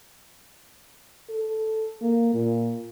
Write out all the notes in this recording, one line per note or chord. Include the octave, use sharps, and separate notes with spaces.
A4
A#3
A#2